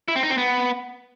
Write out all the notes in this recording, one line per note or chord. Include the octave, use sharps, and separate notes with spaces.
E4
C4
D#4
C4
B3